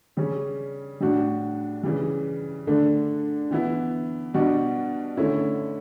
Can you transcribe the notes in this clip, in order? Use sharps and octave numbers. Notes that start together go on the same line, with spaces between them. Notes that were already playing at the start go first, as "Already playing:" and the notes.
C#3 G3 C#4
A2 G3 D4 F#4
C#3 E3 G3
D3 A3 D4
E3 B3 E4
B2 G3 D4 F#4
D3 A3 C#4 E4